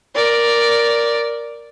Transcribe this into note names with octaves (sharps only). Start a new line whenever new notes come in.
A#4 D5